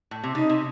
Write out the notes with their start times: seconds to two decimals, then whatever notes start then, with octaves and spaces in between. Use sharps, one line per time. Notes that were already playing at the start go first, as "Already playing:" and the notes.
0.11 A2
0.24 C3
0.35 C#3 D#4
0.49 C3